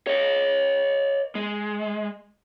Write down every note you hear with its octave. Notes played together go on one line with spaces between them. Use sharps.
C#5 D#5
G#3